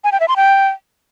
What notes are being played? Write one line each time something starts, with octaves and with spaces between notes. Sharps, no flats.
G#5
G5
E5
C6
G5